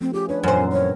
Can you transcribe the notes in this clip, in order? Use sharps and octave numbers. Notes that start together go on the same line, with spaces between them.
F3 A3 C4
C#4 F4 G4 G#4
D4 F4 B4 C#5
F#2 A#2 E3 C5 G#5
C4 C#4 A#4
C#5